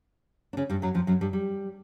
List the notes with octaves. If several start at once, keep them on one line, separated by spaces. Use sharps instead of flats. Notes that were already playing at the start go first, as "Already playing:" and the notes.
D4
C#3 C#4
G2 G3
F#2 F#3
F2 F3
F#2 F#3
G2 G3
G3